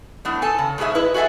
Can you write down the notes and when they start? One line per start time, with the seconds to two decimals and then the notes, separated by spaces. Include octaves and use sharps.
0.25 A2 B3 D4
0.42 A4 G#5 A5
0.58 C#3
0.78 G#2 B2 F#3 G#4 E5
0.95 E4 B4 D#5
1.14 F#4 G#4 A4 E5 G#5